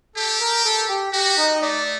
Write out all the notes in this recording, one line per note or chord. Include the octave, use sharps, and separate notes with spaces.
G4 A4
A#4
A4
G4
F#4 G4
D#4
D#5
A3 D5